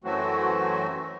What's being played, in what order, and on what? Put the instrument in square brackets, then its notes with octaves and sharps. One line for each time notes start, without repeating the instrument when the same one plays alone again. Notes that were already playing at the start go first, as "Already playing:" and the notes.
[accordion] F#2 E3 F#3 A3 C4 F#4